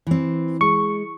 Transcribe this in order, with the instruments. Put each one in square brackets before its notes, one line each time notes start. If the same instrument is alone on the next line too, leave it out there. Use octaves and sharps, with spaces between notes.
[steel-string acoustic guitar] E3 C4
[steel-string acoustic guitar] G#3 [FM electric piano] C#6